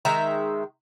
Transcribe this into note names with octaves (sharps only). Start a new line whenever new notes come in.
D#3 G#3 E5 A#5